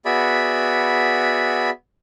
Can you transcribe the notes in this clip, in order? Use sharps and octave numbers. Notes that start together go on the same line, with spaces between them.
B3 F#4 G#4 D5 E5 B5